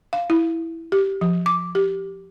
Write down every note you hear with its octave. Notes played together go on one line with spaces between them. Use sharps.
F5
E4
G4
F3
D6
G4